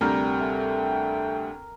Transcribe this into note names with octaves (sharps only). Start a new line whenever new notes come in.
D2 C3 G3 A#4 G5
A3